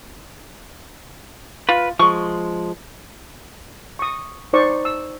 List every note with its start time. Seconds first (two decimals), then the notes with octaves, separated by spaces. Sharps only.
1.69 F4 B4
1.99 F3 G#3 C#6
3.99 C#6 D#6
4.53 D#4 C5 D5 C#6
4.85 E6